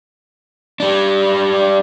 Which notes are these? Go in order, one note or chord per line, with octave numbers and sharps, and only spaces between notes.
G3 D4